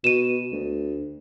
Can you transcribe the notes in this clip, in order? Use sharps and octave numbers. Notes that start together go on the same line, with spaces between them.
B2 D#7 E7
D2